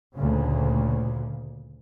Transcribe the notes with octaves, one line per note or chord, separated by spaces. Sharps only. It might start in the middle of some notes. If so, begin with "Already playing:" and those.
D2 A#2 C#3